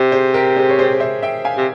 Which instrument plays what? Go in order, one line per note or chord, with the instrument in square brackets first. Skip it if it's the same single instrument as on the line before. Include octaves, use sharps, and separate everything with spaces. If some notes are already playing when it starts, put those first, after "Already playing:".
Already playing: [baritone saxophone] C3
[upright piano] G#4 C5
G4 A#4
G#4 C5
C#5
G#4 C5
C5 E5
E5 G5
F5 G#5
[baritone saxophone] C3